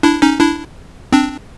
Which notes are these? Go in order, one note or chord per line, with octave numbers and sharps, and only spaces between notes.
D4 E4
C#4 D#4
D4 E4
C4 D4